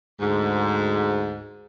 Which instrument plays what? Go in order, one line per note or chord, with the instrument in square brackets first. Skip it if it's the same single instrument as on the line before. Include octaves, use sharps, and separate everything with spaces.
[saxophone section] D2 G#2